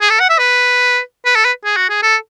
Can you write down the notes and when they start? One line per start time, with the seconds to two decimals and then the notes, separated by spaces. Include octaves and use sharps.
0.01 G#4
0.10 A4
0.20 F#5
0.30 E5
0.39 B4
1.26 B4
1.36 A4
1.45 B4
1.65 G#4
1.77 F#4
1.90 G#4
2.03 A4